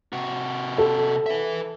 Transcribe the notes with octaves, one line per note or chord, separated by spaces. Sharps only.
C3 F#4
A4
B4 E5